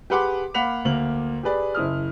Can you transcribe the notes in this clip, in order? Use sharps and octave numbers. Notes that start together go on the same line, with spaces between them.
G4 G#4 B4 F#5 C6 D6
A#3 F5 F#5 B5 B6 F7
D2 A#3 F#7
G4 G#4 B4 D5
F#1 E4 D#6 F6